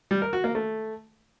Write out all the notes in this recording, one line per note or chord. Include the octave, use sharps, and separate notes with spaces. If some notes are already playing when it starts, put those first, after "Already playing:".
G3
A#4
F#4
A#3
A3